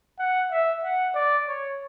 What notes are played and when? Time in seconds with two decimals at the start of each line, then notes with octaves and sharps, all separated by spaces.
0.19 F#5
0.51 E5
0.84 F#5
1.15 D5
1.48 C#5